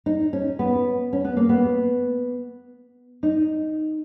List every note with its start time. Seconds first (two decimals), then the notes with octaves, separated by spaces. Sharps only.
0.06 D#4
0.33 C#4
0.59 B3
1.13 C#4
1.25 B3
1.37 A#3
1.49 B3
3.23 D#4